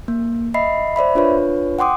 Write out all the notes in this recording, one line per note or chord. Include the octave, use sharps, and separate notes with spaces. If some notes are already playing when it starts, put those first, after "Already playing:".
A#3
D#5 E5 B5 C7
C5 D5 E5 B5
D4 F4 B4 C#5
F#5 G5 C6 D6 D#6